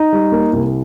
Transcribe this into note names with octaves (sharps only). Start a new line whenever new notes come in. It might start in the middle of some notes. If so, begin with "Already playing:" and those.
Already playing: D#4
G3
A#3
C2